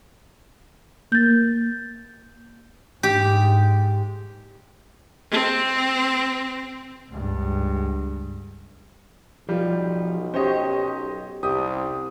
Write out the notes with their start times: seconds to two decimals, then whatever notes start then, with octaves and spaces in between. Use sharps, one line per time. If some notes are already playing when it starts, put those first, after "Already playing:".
1.12 A#3 G6 A6
3.03 G#2 G4
5.31 C4
7.11 C#2 G2
9.49 B1 F3 G3
10.34 C#4 G4 C5 C#5 D#5
11.43 C2 G4 D#6